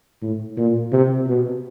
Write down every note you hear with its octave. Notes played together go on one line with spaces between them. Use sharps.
A2
A#2
C3
B2